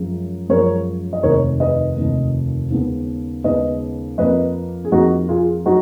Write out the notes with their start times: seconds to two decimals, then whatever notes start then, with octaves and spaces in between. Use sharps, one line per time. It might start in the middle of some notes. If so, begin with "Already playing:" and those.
Already playing: F#2 F3 G#3
0.49 F#2 F3 G#3 A#4 C#5
1.13 D#5
1.23 F1 D#2 D#3 A#3 A#4 C#5
1.60 B4 D#5
1.97 F1 D#2 D#3 A#3
2.71 D#2 C#3 G#3 B3
3.44 D#2 C#3 G#3 B3 B4 D#5
4.18 F2 F3 A#3 B4 D#5
4.85 G#4
4.92 F2 F3 A#3 D#4 F#4
5.29 F4 G#4
5.66 F#3 D#4 F#4